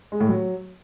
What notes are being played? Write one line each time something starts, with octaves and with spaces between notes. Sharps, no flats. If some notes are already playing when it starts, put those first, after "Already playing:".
G#3
A2
F#3